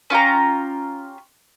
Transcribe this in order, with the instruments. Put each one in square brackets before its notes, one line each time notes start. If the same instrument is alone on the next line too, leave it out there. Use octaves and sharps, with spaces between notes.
[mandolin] C#4 F4 G4 A#5